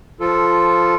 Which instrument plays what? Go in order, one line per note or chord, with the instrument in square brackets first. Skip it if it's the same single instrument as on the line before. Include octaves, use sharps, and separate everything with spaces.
[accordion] F3 F4 A4